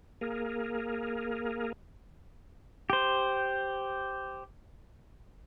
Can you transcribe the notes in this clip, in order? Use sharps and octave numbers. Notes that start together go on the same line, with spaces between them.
A#3 G#4 A#4
G4 C5